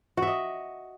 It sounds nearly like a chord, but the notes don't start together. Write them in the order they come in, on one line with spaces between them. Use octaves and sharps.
F#4 E5 D#5